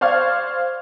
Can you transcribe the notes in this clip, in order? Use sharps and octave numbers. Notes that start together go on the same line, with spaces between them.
C5 D5 F5 C#6 F6 G#6